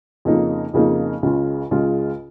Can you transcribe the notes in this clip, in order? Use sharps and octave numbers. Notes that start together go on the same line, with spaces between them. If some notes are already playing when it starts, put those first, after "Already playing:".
F2 C#3 A#3 D#4
F2 C#3 A#3 D#4
C#2 C#3 G#3 F4
C#2 C#3 G#3 F4